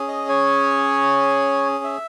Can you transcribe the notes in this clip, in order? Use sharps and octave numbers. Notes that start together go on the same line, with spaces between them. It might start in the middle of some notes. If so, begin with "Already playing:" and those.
Already playing: C#4 G#4
D#5
C#5
E5